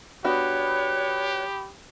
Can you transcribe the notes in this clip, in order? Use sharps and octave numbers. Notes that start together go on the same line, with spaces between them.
B3 D4 F#4 G4 C#5 B5 D#6 F#6